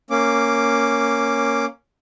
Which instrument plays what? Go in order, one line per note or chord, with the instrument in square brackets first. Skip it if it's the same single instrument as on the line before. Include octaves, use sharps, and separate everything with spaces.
[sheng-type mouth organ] A#3 C#4 D6